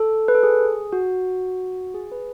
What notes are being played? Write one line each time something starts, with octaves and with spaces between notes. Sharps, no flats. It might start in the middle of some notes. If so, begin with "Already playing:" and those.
Already playing: A4
B4
A4
G#4
F#4
G#4
B4